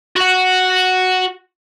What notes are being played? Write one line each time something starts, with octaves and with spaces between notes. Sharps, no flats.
F#4 F#5